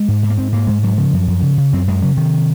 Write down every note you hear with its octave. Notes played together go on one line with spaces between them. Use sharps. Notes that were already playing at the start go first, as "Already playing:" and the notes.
Already playing: G#3
G#2
G#2
A#3
G#2 C4
G#2 A#3
G#2 G#3
G#2 F#3
C#3 F3
F#2
F#2
C#3
C#3
F#2 C4
F#2 G#3
C#3 F#3
C3 D#3